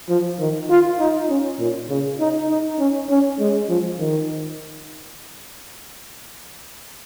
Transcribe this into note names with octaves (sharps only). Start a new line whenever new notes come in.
F3
D#3
F4
D#4
C#4
A#2
C#3
D#4
D#4
C#4
C#4
G#3
F3
D#3